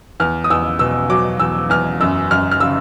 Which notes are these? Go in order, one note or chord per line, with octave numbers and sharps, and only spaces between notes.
E2 F6
D#6
E2 E6
B2 E6
F#3 D6
E2 E6
E2 F6
F#2 E6
F#2 F6
F6
C#3 E6